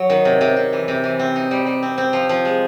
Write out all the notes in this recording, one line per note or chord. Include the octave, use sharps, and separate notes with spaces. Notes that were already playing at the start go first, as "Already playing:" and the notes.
Already playing: F#3
D#3
C3
C3
C3
E3
C3
E3
C4
D#4
G3
G3
C4
C4
F3
F3
G#3